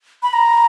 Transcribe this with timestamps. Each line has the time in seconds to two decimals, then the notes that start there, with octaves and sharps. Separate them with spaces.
0.23 B5
0.33 A#5